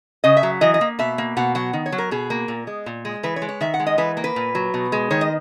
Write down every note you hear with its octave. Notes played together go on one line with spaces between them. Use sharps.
C#3 D#5
E5
F#3
E3 D#5
D#5
A#3
B2 E5
A#3
B2 F#5
F#3 F#5
D#3
C#5
F#3
A#4
B2 G#4
A#3
A#2
G#3
A#2
G#3
E3 B4
C#5
G#3
C#5
D#3 E5
F#5
G#3
D#5
E3 B4
A#3
B4
A#2
F#3
B2
G#3
D#3 C#5
D#5